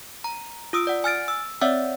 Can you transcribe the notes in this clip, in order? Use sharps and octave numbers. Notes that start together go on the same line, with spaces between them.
A#5
F4 D#6 E6 D7
D5 F#5
G#5 F6 A6 D7
E6
C4 C#5 D5 E5 F#5 E6